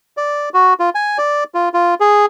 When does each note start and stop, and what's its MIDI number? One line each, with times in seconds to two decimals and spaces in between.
0.17 0.49 74
0.54 0.74 66
0.80 0.90 65
0.95 1.18 80
1.18 1.44 74
1.54 1.69 65
1.74 1.94 65
2.00 2.26 68